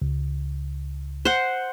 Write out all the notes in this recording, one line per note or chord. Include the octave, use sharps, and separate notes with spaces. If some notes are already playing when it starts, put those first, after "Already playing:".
C#2
C5 F#5